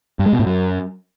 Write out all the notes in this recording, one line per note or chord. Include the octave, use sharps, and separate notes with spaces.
G2
G#3
B2
A2
F#2